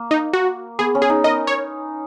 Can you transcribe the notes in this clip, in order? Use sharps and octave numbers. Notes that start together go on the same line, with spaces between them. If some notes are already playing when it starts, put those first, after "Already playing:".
Already playing: A#3
D#4
F#4
B3 G#4
C#4
G#4
D#4
A#4 D#5
C#5